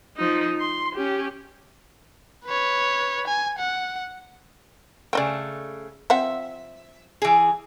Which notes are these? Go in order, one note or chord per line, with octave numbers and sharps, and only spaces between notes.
F3 D#4
C6
C#4 G4
B4 C#5
G#5
F#5
C#3 A3 D5 D#5 G5
F3 C4 E5 F#5
E3 G#4